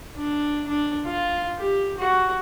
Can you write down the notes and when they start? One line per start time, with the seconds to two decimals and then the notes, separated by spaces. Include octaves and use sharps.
0.16 D4
0.67 D4
1.05 F4
1.58 G4
1.97 F#4